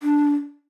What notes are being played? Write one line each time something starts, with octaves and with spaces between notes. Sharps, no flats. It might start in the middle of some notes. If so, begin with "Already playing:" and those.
D4